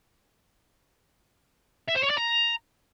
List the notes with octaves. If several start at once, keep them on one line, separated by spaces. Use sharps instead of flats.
E5
C5
C#5
D5
A#5